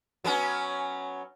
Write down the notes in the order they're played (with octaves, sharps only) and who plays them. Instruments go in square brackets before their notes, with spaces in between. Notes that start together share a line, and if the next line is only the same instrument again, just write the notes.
[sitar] F#3 B3 C#4